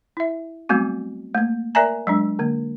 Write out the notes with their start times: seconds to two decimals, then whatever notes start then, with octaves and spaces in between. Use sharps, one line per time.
0.17 E4 E5
0.69 F#3 G3 A3 B3 C4 F#4
1.34 A3 A#3
1.75 A#4 D5 E5 G#5 A#5
2.07 F#3 G#3 D4
2.39 D3 A#3